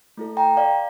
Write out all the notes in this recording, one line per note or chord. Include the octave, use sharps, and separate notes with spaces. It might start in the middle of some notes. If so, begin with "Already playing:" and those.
A3 E4 A4
G5 A#5
D5 F5